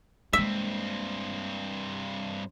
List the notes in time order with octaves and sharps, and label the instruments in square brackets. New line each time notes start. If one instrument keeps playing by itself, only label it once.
[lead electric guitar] G2 C4 [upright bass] G#3 A#3 [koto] E5